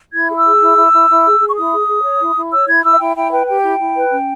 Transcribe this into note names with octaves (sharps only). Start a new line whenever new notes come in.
E4 G#6
G#4
E6
G#4
E4
E4
E4
E4
G#4
G#4
C#6
E4 D#6
G#4
G#4
C#5
E4
E4
C#5 E6
E4 G#6
E4 E6
E5
E4 G5
E4 G5
B4 G5
G4 G5
E4
E4
B4
C#4